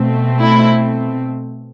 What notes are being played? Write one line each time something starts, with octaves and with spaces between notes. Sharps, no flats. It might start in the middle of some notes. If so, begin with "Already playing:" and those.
Already playing: B2 A3 C4
E4